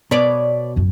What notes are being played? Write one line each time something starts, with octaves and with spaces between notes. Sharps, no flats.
B2 B4 C#5 D5
A1 F#2